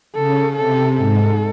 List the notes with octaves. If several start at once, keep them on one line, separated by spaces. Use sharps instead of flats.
C#3 A4
C3 A4
G#2 A4